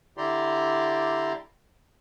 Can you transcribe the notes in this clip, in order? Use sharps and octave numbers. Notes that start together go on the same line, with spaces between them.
D3 E4 G4 D5 A#5 C6